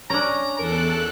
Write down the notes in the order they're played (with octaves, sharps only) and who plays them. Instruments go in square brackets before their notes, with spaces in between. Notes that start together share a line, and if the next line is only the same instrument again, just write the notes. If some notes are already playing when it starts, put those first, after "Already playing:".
[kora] C#4 D4 [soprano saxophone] A#5
[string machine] E2 A4 F#6 [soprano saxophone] A#4